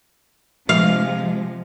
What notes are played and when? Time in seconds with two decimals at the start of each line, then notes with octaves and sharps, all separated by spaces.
0.69 C3 F3 G#3 F5